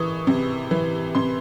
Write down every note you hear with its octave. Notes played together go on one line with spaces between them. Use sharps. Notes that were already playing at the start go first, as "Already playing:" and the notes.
Already playing: E3 C#6 D#6
C3
E3
C3 C6